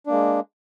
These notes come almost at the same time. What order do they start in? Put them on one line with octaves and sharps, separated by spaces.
D4 A#3 G#3